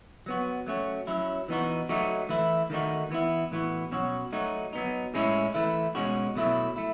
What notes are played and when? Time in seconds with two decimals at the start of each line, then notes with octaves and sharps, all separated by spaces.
0.26 F#3 B3 F#4
0.66 F#3 A3 C#4 F#4
1.07 F#3 C#4 E4
1.48 E3 B3 D#4 F#4
1.89 F#3 A3 D#4 F#4
2.29 E3 A3 E4
2.70 D#3 A3 D#4 F#4
3.11 E3 B3 E4
3.51 A2 E3 B3 F#4
3.91 B2 F#3 C#4 F#4
4.33 F#3 A3 D#4 F#4
4.73 F#3 B3 D#4
5.14 A2 G#3 C#4 E4
5.54 E3 A3 E4
5.95 B2 G#3 C#4 F#4
6.35 B2 F#3 A3 E4
6.76 A3 E4